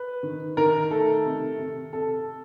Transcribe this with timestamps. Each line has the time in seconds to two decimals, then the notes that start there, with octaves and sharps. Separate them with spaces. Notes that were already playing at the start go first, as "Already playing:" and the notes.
Already playing: B4
0.23 D#3
0.57 D#3 A#4
0.91 A3 A4
1.25 C3
1.59 C3
1.93 C3 A4